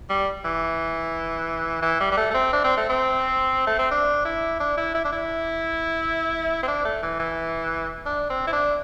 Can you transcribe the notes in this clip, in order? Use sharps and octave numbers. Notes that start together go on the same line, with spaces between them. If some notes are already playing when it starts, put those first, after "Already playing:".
G3
E3
E3
G3
G3
A3
A3
C4
D4
C4
A3
C4
A3
C4
D4
E4
D4
E4
E4
D4
E4
C4
D4
A3
E3
E3
D4
C4
E4
D4